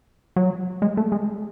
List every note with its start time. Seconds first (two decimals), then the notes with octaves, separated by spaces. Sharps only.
0.36 F#3
0.82 G#3
0.97 A3
1.12 G#3